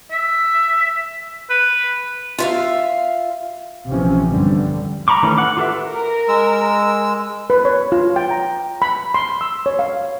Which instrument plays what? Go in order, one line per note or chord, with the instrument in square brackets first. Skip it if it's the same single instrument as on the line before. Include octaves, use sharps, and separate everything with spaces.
[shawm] E5
B4
[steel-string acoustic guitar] F4 E5 F5
[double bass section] A#1 C3 E3 F3 C#4
E2 G2 D3 G3
[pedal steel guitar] A#5 B5 C#6 D6
D#3 E3 A3 C#4
F#5 D6
F4 G4 A4 B4 E5
[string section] A#4
[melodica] G#3 E6
[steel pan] B4
C#5
F4
G5
A#5
B5
C6
E6
C#5
F5